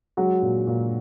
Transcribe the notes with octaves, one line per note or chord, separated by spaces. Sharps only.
F#3 G#3 F#4
A#2
A#2